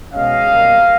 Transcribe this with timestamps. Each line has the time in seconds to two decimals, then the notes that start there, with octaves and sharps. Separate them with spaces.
0.12 B2 G#3 C#4 D#5 F5
0.46 B2 G3 A#3